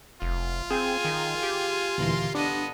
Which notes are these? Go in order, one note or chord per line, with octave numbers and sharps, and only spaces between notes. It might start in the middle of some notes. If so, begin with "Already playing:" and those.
F1 F4
C4 G#4 G5 G#5
D#3
G4
D2 A#2 E3 A#3 C6
B3 D4 A4 D#5